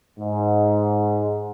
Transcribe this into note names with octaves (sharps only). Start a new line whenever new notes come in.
G#2